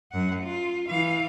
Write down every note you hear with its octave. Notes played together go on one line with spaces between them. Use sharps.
F#2 F#5
F4
E3 F5